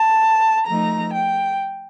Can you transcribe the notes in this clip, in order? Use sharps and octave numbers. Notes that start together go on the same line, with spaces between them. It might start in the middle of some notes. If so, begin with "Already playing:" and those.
Already playing: A5
F3 A3 D#4 A#5
G5